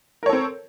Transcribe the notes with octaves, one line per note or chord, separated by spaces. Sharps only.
C4 A4 A#4 C#5